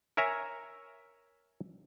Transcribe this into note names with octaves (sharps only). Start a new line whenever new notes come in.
A#4 C#5 E5 G#5 A#5